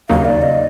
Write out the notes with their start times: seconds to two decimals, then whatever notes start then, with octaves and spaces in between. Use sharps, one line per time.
0.09 D#2 C#3 F#3 A#3 D#4 F5
0.25 D5
0.42 D#5